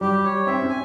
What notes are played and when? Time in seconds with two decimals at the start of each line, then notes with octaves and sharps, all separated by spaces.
0.01 G3 G4
0.24 C#5
0.47 C4 E5
0.62 C#4
0.70 G#5